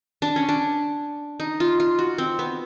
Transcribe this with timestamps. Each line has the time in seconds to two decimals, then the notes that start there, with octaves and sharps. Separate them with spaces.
0.22 D4
0.36 C#4
0.49 D4
1.40 D#4
1.60 F4
1.80 F4
1.99 F#4
2.18 C4
2.39 B3